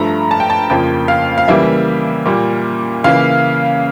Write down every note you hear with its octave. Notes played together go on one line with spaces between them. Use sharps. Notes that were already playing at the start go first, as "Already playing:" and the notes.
Already playing: G2 F3 A3 A#5
A5
G5
A5
F2 C#3 F3 A#3 G5
F5
F5
C#3 E3 G3 A#3 E5
A#2 G3 A#3
C#3 E3 A#3 F5